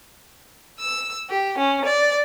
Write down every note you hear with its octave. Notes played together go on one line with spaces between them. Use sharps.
E6
G4
C#4
D5